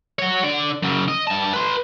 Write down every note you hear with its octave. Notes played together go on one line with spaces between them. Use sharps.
F#4 C#5
D3 D5
F#2 C#3
D#5
G2 A5
B4 C6